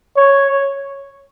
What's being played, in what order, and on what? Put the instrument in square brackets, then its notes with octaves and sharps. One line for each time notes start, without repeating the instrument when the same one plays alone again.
[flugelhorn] C#5